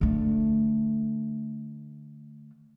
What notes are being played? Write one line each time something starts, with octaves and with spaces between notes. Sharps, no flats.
D3 A3